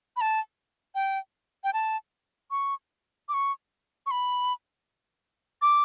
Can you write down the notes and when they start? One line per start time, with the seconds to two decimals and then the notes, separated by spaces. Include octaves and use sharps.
0.17 B5
0.21 A5
0.95 G5
1.64 G5
1.73 A5
2.51 C#6
3.29 D6
3.34 C#6
4.06 C#6
4.11 B5
5.62 D6